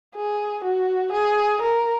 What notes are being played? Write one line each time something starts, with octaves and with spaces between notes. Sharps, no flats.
G#4
F#4
G#4
A#4